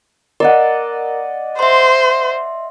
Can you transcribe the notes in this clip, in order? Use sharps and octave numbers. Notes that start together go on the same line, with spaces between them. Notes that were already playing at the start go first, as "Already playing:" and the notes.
A#4 D5 D#5 F#5
C5 E5 C6